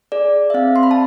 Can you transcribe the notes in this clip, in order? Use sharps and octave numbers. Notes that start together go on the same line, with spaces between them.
G#4 D5
E5
C4 F5
C6
B5
A5